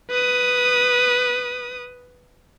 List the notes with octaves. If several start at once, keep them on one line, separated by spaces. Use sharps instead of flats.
B4 D#6